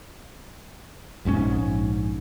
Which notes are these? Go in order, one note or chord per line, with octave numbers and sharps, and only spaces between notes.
A#1 G#2 D3 C#4